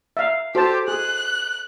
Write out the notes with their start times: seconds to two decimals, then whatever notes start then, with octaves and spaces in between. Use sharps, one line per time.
0.17 E5 F5
0.55 F#4 G4 A4 C5 A5
0.88 G#4 F#6